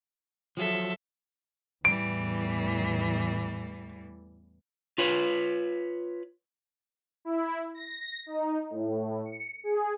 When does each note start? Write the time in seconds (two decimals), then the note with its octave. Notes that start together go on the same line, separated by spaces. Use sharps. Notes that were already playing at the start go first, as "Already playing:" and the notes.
0.57 F3 F#3 A4 E5
1.85 E2 A2 E3 G3 D7
4.98 F4 B4 C#5
7.25 E4
7.74 A#6
8.26 D#4
8.70 A2
9.26 C#7
9.64 G#4